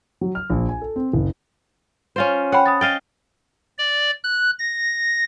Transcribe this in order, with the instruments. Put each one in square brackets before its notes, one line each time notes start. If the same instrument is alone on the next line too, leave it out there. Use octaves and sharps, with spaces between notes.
[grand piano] F#3
F6
A#1
G#5
A4
C4
F#1
[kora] C#4 F4 C5
[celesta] C#5 G5 B5 [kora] F#5
[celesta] B5 D#6 A6
[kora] D#5 F5 G5 [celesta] A6
[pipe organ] D5
F#6
A#6